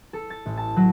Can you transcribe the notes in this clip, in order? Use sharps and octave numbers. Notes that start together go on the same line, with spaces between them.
A4
A6
A1
A5
F#3